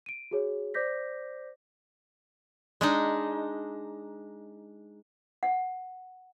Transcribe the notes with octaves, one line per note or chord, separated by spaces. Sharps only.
D7 D#7
F#4 G#4 C#5
C5 D5 D6 G6 A#6 B6
G#3 D4 D#4
F#5